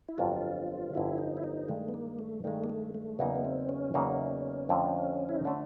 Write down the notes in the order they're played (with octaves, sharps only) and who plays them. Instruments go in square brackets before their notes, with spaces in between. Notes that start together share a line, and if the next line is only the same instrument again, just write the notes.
[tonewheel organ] E4
[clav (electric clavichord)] G1 F2 D3 F#3 [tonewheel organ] F4
[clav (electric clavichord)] G1 F2 D3 F#3 [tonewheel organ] E4
[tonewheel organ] D#4
E4
D#4
[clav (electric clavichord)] G2 D#3 G#3 [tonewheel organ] A3
[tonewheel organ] B3
A#3
A3
[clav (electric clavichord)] G2 D#3 G#3 [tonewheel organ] A3
[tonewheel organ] A#3
A3
A3
[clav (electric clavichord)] E2 C#3 F#3 A#3 D#4 [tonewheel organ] B3
[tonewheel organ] B3
C4
C#4
[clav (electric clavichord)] E2 C#3 F#3 A#3 D#4
F2 D3 F3 A3
[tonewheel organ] E4
D#4
[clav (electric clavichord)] D3 F3 A3 [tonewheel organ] D4